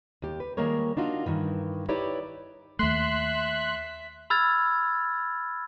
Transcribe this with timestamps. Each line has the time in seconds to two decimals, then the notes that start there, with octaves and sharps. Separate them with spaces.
0.22 D#2 G4
0.40 B4
0.57 D#3 G3 G#3 A#3 A#4 C#5
0.97 D4 D#4 F4 F#4
1.26 G2 D#3 E3
1.89 D#4 E4 G4 B4 C#5 D5
2.79 D#2 A3 E5 C6 F#6 B6
4.30 B5 E6 F6 G#6 A6